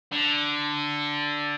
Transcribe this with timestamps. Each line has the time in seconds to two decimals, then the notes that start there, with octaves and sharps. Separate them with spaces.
0.12 D3